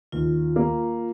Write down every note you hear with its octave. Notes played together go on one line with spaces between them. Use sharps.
D#2 F4
A#3